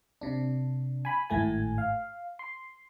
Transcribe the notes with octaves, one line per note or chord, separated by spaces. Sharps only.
C3 D4
G#5 B5
G#1 A2 A3 G#5
F5
C6